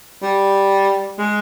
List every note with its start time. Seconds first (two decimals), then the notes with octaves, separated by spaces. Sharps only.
0.22 G3
1.19 G#3